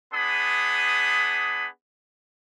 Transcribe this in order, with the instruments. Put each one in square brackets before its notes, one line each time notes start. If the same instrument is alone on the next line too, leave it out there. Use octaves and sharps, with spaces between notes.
[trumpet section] B3 D4 G#4 B5 D#6